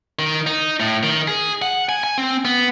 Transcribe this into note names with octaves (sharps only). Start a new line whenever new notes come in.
D#3
D#4
A2
D#3
G#4
F#5
G#5
G#5
C4
B3